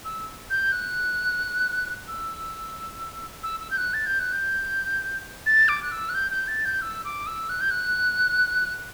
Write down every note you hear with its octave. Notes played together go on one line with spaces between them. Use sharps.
E6
G6
F#6
E6
E6
E6
G6
F#6
A6
G6
F#6
G6
A6
D6
F#6
E6
F#6
G6
G6
A6
G6
E6
D6
E6
F#6
G6
F#6